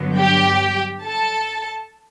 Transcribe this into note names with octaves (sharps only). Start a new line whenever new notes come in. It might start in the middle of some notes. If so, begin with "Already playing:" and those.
Already playing: G2 D3 F#3 B3
G4 G5
A4 A5